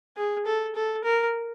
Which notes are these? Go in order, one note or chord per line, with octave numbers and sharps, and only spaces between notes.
G#4
A4
A4
A#4